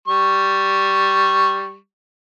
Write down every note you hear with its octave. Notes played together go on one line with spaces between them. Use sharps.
G3 C#6